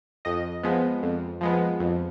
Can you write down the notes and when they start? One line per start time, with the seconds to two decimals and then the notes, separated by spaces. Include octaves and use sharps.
0.25 F2 D#5
0.63 F3 G#3 B3
1.03 F2
1.41 F3 G#3 B3
1.80 F2